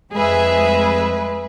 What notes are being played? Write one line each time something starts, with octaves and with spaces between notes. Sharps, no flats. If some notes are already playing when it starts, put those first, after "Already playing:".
F2 G#3 G#4 B4 E5